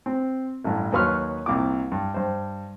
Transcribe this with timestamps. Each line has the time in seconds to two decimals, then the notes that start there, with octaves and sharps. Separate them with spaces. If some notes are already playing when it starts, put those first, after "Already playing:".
0.06 C4
0.64 A1 G2
0.92 D#2 F#3 B4 C6 C#6 F6
1.46 C2 A#2 D6
1.92 G2
2.14 G2 C5